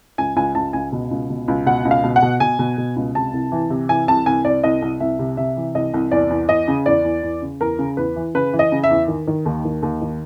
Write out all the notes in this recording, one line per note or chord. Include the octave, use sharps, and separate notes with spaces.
C#2 G#5
C#2 G#5
C#2 A5
C#2 G#5
B2
C#2
B2
C#2
B2 F#5
C#2
F5
B2
F#5
B2
B2 G#5
B2
B2
C#2
C3 A5
C2
E3
C3
E3 G#5
C2 A5
C2 G#5
C2 D5
C2 D#5
C2
C2 E5
C3
C3 E5
E3
C2 D#5
C2
E2 D5
E2
E2 D#5
C#3
E2 D5
E2
E2
C#3
E2 A#4
C#3
E2 B4
E3
C#3 B4
E3
D#5
C#3
E5
E2
D#3
D#3
D#2
D#3
D#2
D#3